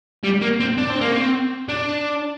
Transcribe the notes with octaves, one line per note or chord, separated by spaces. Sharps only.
G3
A#3
C4
D4
C4
A#3
C4
D4